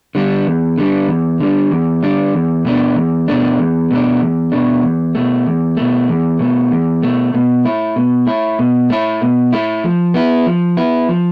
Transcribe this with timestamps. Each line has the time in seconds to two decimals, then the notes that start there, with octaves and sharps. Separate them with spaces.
0.15 D3 G3 D4
0.46 E2
0.78 D3 G3 D4
1.08 E2
1.40 D3 G3 D4
1.71 E2
2.03 D3 G3 D4
2.34 E2
2.65 B2 A3 D4
2.96 E2
3.28 B2 A3 D4
3.59 E2
3.91 B2 A3 D4
4.21 E2
4.52 B2 A3 D4
4.83 E2
5.15 B2 A3
5.47 E2
5.77 B2 A3
6.09 E2
6.39 B2 A3
6.71 E2
7.03 B2 A3
7.34 B2
7.65 A3 E4
7.96 B2
8.27 A3 E4
8.59 B2
8.90 A3 E4
9.22 B2
9.53 A3 E4
9.84 F3
10.14 B3 E4
10.46 F3
10.77 B3 E4
11.09 F3